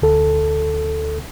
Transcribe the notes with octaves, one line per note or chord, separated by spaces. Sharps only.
D2 A4